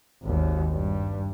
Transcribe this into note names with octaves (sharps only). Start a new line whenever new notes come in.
G#1 D#2
G2